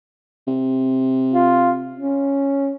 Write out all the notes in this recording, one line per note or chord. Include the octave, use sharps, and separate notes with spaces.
C3
F4
C#4